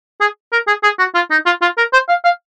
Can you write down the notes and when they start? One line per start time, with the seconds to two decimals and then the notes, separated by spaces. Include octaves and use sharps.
0.21 G#4
0.53 A#4
0.68 G#4
0.84 G#4
0.99 F#4
1.15 F4
1.31 D#4
1.46 F4
1.62 F4
1.78 A#4
1.93 C5
2.09 F5
2.25 F5